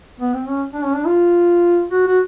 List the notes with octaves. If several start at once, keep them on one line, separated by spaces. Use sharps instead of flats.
B3
C4
C#4
D4
C#4
D4
F4
F#4
F#4